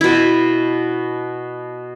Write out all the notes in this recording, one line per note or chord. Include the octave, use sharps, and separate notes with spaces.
B2 E4